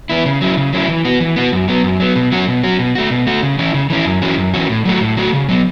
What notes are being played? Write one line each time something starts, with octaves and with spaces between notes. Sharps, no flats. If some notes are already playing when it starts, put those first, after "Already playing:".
E3 B3 E4
C#3
F#3 C#4 E4
C#3
F#3 C#4 E4
E3
B3 F#4
E3
B3 F#4
F#2
F#3 B3
F#2
F#3 B3
B2
F#3 C#4 F#4
B2
F#3 C#4 F#4
B2
A3 F#4
B2
A3 F#4
C#3
E3 C#4 E4
C#3
E3 C#4 E4
F#2
E3 C#4 F#4
F#2
E3 C#4 F#4
A2
F#3 A3 F#4
A2
F#3 A3 F#4
C#3
F#3 B3